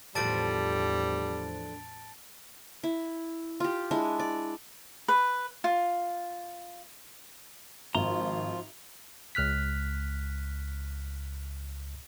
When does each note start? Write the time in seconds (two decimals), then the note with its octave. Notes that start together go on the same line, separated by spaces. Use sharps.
0.15 E2 A2 D3 F3 G3 A5 A6 D7
2.83 E4
3.60 F4 G4
3.91 G#3 D4 E4
4.20 D5
5.08 B4
5.64 F4
7.95 G#1 F3 F4 A#5 C6
9.35 C#2 F6 F#6 B6